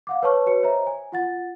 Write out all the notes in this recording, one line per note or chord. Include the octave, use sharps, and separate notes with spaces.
F5 F#5 D6
B4 C#5 A5 C#6 F6
F#4 B4 C#5 C#7
C5 C#5 D#5 E5 A#5
G#5
F4 F#5 A6